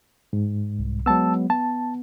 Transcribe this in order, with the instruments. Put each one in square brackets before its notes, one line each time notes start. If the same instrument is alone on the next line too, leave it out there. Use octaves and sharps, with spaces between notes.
[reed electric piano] G#2
[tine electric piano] C2
[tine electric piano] F#3 G#3 B3 [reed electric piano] A5 E6
[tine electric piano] B3 [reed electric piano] A5